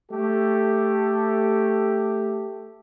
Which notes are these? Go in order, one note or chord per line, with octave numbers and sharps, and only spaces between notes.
A3 G4 A4